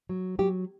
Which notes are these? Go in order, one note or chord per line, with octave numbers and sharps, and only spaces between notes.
F#3
F#3 G4